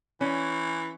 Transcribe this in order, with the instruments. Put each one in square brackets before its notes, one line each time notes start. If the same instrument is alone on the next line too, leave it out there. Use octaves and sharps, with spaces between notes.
[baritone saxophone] E3 [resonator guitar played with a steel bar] C#4